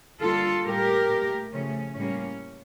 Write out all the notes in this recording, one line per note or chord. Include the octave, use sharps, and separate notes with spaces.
D3 G3 A#3 F4 A4
A2 G3 A#3 G4 A#4
A#2 A3
C#3 F3 A3 C#4
A2 G3 A#3 C#4